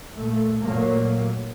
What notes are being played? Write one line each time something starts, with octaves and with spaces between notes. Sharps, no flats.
A#2 A3
A#2 F#3 A3 A#3